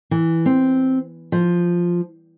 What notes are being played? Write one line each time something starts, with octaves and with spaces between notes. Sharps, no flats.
E3
C4
F3